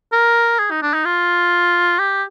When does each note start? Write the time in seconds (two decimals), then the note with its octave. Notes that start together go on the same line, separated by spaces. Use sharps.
0.13 A#4
0.59 G#4
0.71 D#4
0.82 D4
0.94 D#4
1.05 F4
1.99 G4